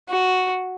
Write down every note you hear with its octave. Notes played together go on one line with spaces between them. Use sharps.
F#4